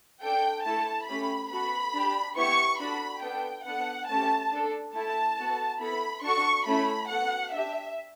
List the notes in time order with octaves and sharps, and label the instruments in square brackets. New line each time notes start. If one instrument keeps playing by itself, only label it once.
[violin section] D4 A4 G5
A3 E4 A4 A5
A3 C#4 G4 B5
B3 F#4 A4 B5
D4 G4
B3 E4 G4 C#6
D4 F#4 A4 B5
B3 D4 A4 G5
B3 D4 A4 F#5
A3 C#4 G4 A5
D4 A4
A3 E4 A4 A5
B3 F#4 A4
B3 E4 A4 B5
D4 F#4 A4 C#6
A3 C#4 E4 B5
B3 F#4 A4 F#5
D4 G4 E5